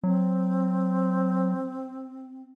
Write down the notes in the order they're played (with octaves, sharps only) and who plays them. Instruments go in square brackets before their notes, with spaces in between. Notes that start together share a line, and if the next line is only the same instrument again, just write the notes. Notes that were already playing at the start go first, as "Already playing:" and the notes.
[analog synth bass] F#3 [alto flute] C4